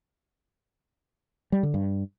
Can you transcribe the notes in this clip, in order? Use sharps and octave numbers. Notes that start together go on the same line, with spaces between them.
G3
D3
G2